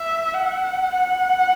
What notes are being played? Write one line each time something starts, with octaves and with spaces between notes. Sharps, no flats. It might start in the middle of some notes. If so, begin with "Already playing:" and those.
Already playing: E5
F#5
F#5